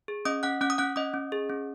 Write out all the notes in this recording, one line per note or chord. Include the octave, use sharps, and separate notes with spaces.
G#4
C#4 D#5 D#6
C#4 F#5 F#6
C#4 F#5 F#6
D#6
C#4 F#5 F#6
C#4 D#5 D#6
C#4
G#4
C#4